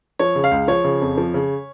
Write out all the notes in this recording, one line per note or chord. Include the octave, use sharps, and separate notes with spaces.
F3 C#5
C#3
F5
C#2
F3 C#5
C#3
F2
F3
C#3